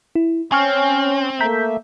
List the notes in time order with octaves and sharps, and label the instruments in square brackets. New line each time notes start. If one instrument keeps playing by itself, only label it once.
[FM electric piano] E4
[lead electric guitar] C4 [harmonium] C#4 [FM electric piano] G#5 C#6 F6
[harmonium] A3 A#3 E5 [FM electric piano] A#5 G6 B6